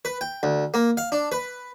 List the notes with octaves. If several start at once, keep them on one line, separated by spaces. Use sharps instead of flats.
B4
G5
D2
A#3
F5
D4
B4